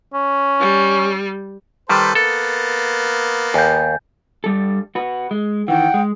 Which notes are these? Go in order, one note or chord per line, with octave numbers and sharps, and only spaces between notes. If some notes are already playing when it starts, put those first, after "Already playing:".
C#4
G3
D#3 G3 A4 B4 C5
A#3 B3 A4 A6
D#2 G#5 G6
G2 G3 A4
F#4 B4
G#3
D#3 E3 F#5 G5
G#3